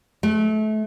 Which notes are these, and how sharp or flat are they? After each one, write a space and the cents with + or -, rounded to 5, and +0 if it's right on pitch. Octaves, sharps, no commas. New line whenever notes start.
A3 -30